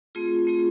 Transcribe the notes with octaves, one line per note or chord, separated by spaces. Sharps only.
A3 C4 F4 G#4
A3 C4 F4 G#4